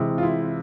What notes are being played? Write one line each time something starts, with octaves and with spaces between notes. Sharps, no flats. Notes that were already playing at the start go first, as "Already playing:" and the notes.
Already playing: C3 E3 G#3
F4
E4